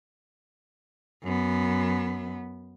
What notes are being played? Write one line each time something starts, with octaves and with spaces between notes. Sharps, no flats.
F#2 B3